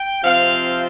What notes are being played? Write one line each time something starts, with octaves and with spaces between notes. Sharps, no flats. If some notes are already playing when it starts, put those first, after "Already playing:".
Already playing: G5
C3 F3 C4 F5